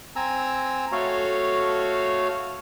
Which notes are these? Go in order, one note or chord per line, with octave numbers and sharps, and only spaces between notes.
C4 G#5 A#5 E6
A3 F#4 A4 C#5 F5